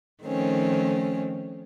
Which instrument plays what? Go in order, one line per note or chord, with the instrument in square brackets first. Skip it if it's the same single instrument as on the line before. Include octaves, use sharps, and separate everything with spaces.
[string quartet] D#3 F3 A3 C4 C#4